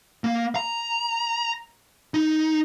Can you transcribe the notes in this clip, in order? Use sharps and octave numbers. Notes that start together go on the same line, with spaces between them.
A#3
A#5
D#4